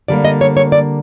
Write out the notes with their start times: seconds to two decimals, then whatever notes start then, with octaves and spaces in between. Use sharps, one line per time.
0.08 D3 G3 A#3 D5
0.25 D#5
0.41 C#5
0.57 C#5
0.72 D5